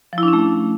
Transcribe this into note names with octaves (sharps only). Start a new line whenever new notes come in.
F3
E4
D4
C#4
A3